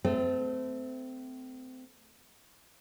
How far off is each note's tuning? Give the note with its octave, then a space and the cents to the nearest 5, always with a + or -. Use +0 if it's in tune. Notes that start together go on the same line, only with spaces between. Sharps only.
A3 -5 C4 -30